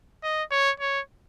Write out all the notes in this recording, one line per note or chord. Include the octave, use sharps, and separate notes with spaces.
D#5
C#5
C#5